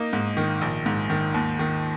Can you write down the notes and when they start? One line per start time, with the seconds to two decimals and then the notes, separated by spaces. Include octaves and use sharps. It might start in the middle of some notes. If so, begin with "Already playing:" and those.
Already playing: A#3 D#4
0.13 G#2
0.37 D#3
0.61 A#1
0.86 G#2
1.10 D#3
1.34 D#2
1.59 D#3